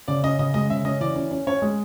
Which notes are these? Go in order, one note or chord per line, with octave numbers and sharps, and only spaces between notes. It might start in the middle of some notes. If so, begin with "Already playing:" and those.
C#3 D5
C#4 D#5
C#3 D#5
G#3 D#5
C#3 E5
C#4 D#5
E3 D5
C#4
C#4
C#4 C#5
G#3